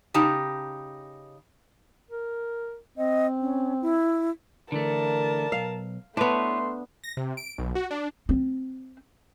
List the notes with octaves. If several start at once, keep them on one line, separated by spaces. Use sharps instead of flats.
C#3 D#4 G4 A5
A#4
C4 D#5
C#4
E4
D3 E3 A3 A#4 D5 A5
B1 F5
A3 B3 D4 E4 B4 C#5 C6
A#6
C3
D7
B1
F#4
D4
C4